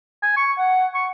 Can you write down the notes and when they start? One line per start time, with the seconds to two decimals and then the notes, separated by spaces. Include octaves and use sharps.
0.23 G#5
0.36 C#6
0.58 F#5
0.94 C#6